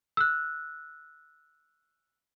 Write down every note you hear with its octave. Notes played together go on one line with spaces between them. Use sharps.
E6 F#6